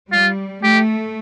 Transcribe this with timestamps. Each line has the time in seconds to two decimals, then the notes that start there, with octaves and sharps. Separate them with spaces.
0.12 G3 F4
0.63 A3 G4